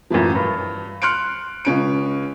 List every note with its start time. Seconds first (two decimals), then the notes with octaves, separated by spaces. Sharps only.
0.10 F#2 A2 E3 F3
0.35 G2
1.02 C6 F6 F#6 C#7 D7
1.65 C#2 C#4 D7